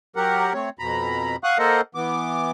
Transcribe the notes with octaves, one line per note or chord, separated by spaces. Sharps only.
F#3 G4 A#4 F#5
A3 C4 C#5
F2 B2 A#5 B5
F5 F#5 C#6 D#6 F#6
A#3 A4 A#4 C5 D#5 F#5
E3 B3 D6